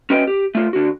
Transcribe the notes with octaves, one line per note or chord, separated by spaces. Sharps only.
C#4 F#4 B4 D#5 G5
G4
A3 F4
D3 F#4